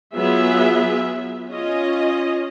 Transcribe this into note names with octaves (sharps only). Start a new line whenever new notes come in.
F#3 B3 F4 G#4 E5
C#4 F4 D#5